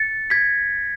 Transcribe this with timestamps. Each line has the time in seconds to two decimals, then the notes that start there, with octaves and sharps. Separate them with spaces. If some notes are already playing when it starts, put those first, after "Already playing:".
Already playing: A6 C#7
0.30 G#6 B6